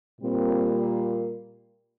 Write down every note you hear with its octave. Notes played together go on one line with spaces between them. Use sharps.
A#2 G3 A#3 C4